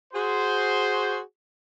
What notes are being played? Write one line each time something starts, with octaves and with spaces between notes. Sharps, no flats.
F#4 G#4 C5